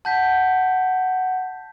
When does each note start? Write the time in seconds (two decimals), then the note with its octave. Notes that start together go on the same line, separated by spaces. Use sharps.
0.05 F#5 A5 G6 B6